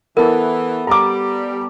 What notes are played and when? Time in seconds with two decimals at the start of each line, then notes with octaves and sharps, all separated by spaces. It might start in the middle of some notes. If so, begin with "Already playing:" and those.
0.17 E3 B3 A4 A#4
0.87 G3 A#5 D6